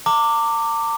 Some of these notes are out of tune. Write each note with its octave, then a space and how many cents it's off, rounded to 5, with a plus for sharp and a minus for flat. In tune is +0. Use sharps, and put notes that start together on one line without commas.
A#5 -45 D6 +0